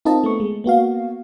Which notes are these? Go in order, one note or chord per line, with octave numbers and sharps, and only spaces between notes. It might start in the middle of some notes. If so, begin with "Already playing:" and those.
C4 D#4 F4 A#4 D#5 A5
A3 B3 C#6
G#3
A#3 B3 F#4 F5